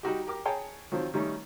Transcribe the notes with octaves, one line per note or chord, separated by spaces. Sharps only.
G3 D#4 F#4 G4
G4 A#4 D6
G#4 C#5 G5 A5 A#5
D#3 F3 F#3 C4
D#3 G3 A3 C#4 D#4